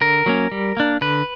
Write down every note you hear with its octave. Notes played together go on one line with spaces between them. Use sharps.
D3 A#4
F#3 A#3 C#4
G3
A#3 D4
D3 B4